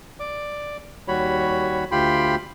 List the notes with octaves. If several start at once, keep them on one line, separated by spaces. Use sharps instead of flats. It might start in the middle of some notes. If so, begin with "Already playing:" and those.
D5 D6
D#2 G3 F#4 C#5 B5
D2 F4 G4 G5 B5 C6